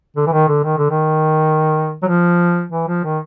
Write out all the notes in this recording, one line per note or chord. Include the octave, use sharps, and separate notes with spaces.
D3
E3
D#3
D3
D#3
D3
D#3
F#3
F3
E3
F3
D#3